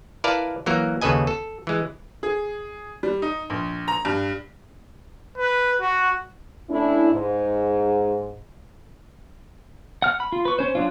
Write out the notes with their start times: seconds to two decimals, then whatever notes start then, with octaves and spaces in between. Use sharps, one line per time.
0.24 E4 A#4 B4 D5 F5 A5
0.66 E3 F#3 A#3 A#4
1.01 D#2 C#3 A4 B4 D#5 G#5
1.27 A4
1.67 E3 G#3
2.23 G#4
3.03 G3
3.22 D#4
3.50 A#1
3.88 A#5
4.05 G2
5.38 B4
5.81 F#4
6.70 A3 C#4 D4 E4
7.13 G#2
10.02 F#5 F6
10.20 B5
10.32 F4
10.45 B4 C#6
10.59 C#4 C5
10.75 F#3 D4 F4